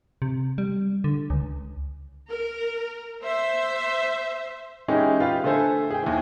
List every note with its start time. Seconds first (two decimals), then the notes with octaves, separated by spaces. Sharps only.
0.22 C3
0.58 G3
1.04 D3
1.30 C#2
2.27 A#4
3.22 C5 E5
4.88 E3 G#3 C#4 D#4 E4 G4
5.20 F4 G4 B4 F5
5.44 D3 A3 A4 C5 E5 G#5
5.91 G#4 G5
6.03 D#2 E3